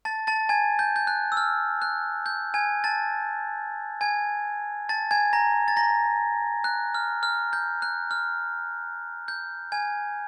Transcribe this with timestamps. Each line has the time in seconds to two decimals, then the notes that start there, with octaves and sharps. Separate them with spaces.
0.05 A5 A6
0.27 A5 A6
0.49 G#5 G#6
0.79 G6
0.96 G6
1.07 F#6
1.32 E6
1.37 F6
1.82 F#6
2.26 G6
2.54 G#5 G#6
2.84 A5 A6
4.01 G#5 G#6
4.89 A5 A6
5.11 G#5 G#6
5.33 A#5 A#6
5.68 A6
5.77 A#5 A#6
6.64 F#6
6.95 F6
7.23 F6
7.53 G6
7.82 F#6
8.11 F6
9.28 G6
9.72 G#5 G#6